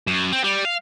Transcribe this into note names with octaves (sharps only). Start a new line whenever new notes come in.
F#2
C4
G3
F5